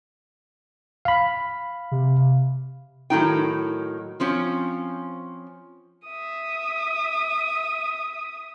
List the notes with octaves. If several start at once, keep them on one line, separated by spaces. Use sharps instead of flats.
F5 B5
C3
A2 D#3 F#3 D#4 G5
F3 C4 C#4
E5 D#6